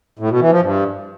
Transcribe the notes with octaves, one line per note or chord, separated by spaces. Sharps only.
A2
B2
E3
F3
G2